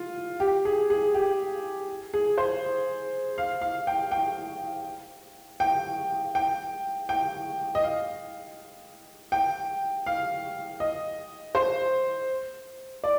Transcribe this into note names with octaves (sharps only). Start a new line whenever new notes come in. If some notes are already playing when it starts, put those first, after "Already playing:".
Already playing: F4
G4
G#4
G#4
G4
G#4
C5
F5
F5
G5
G5
G5
G5
G5
D#5
F5
G5
F5
D#5
C5
D5